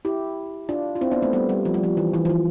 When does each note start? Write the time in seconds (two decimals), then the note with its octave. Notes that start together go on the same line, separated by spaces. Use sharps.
0.05 E4 G4
0.69 D4 F4
0.96 F4
1.01 C4 E4
1.12 B3 D4
1.22 A3 C4
1.33 G3 B3
1.49 G3
1.65 F3
1.74 G3
1.83 F3
1.97 E3
2.14 E3
2.25 F3
2.30 E3